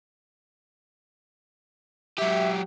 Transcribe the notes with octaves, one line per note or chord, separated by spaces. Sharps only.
F#3 G4 E5